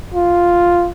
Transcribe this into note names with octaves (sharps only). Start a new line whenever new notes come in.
F4